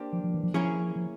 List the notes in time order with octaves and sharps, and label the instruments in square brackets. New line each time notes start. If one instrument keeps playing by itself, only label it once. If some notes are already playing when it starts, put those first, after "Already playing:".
Already playing: [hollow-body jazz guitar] A#3 D4 G4 C5
[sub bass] F3
F3
E3
F3
[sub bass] F3 [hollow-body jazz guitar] A#3 C#4 E4 G#4 C#5
[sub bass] F3